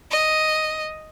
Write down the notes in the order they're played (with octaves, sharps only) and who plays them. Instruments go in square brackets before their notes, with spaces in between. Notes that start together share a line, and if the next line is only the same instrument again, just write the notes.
[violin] D#5